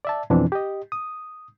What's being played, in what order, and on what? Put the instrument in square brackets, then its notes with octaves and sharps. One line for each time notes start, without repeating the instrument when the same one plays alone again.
[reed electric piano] D5 E5 A5
F2 B2 E3 C4 D4
G4 D#5
D#6